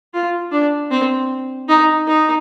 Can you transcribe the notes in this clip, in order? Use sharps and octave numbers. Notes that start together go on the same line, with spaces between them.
F4
D4
C4
D#4
D#4